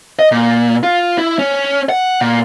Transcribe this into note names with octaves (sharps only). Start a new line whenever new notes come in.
D#5
A#2
F4
E4
C#4
F#5
A#2